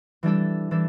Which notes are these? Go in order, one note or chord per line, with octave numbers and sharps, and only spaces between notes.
E3 G3 D4 A4
E3 G3 D4 A4